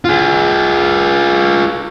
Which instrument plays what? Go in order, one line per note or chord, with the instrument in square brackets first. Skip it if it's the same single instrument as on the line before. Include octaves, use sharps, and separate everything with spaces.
[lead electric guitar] F4 G#4